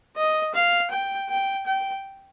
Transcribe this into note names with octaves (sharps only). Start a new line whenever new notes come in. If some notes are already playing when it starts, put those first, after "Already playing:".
D#5
F5
G5
G5
G5